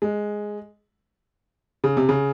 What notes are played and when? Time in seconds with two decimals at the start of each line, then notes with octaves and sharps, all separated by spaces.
0.02 G#3
1.84 C#3
1.97 C3
2.09 C#3